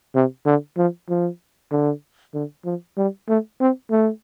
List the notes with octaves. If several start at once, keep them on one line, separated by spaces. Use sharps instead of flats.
C3
D3
F3
F3
D3
D3
F3
G3
A3
C4
A3